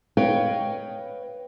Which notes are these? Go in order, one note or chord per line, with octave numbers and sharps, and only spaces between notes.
B4 C#5 D#5 F5 G5